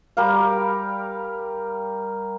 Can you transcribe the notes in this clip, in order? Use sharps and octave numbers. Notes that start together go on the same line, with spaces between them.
G3 G4 A#4 F5